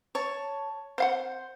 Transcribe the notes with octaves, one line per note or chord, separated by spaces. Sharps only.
C#5 A5
C4 C5 F5 F#5